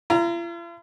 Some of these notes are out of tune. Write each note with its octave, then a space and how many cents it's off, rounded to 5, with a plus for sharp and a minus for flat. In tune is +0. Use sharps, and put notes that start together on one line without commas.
F4 -45 A#5 +0